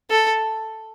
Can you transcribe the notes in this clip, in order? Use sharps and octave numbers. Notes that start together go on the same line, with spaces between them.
A4